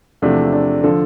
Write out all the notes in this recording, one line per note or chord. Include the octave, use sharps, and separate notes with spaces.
E2 C3 F3 A3 D4
D4
D3 F3 A4